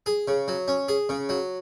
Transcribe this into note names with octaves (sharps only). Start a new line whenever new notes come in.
G#4
C#3
F#3
C#4
G#4
C#3
F#3